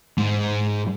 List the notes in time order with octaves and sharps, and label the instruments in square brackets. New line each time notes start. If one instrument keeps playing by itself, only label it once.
[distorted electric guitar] G#2